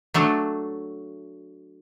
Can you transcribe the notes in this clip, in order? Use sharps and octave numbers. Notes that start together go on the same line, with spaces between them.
F#3 A3 D4